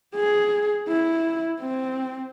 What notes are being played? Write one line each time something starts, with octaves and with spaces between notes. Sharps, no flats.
G#4
E4
C4